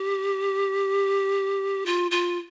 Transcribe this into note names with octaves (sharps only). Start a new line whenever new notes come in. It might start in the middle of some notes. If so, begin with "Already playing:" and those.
Already playing: G4
F4
F4